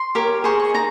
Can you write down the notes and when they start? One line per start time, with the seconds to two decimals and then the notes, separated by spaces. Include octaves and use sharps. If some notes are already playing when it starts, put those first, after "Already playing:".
Already playing: C6
0.15 G4 A#4 C#5
0.44 G#4 C5 D#5 C#6
0.60 C#6
0.74 D#4 A#5